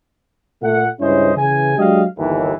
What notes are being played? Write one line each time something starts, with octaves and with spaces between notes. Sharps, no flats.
A#2 A3 F#5
C#2 G2 C#4 E4 C5 D#5
C#3 E3 G#5
F#3 G#3 D4 G4 D#5 F5
G1 D#2 E3